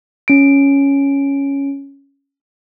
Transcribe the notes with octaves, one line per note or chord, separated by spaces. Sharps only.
C#4 D7